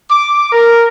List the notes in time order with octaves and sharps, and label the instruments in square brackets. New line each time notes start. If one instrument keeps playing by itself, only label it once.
[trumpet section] D6
A#4